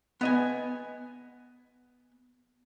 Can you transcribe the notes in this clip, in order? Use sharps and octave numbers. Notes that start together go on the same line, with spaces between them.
B3 D#5 G#5